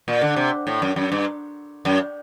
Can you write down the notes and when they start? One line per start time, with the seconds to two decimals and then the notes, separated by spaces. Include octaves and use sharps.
0.08 A#2
0.21 D3
0.36 C3
0.67 A2
0.82 F#2
0.96 F#2
1.12 G2
1.85 F#2